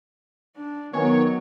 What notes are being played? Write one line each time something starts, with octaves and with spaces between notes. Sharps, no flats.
D4
D#3 F#3 B3 B4 C#5 G#5